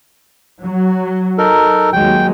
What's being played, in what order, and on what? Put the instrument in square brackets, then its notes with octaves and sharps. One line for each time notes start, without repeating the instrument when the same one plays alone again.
[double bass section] F#3
[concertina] D#4 A4 A#4
[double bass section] D#2 F#3 G#3 [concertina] G5